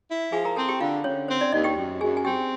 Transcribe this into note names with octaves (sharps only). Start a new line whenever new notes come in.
E4
F3 G#4 G#5
A#4 A#5
C4 A4 A5
G4 G5
D3 F4 F5
D3 C#4 C#5
C4 C5
D4 D5
D#2 D#4 D#5
G4 G5
F#2
F#2 G#4 G#5
G#5
C4 G4 G5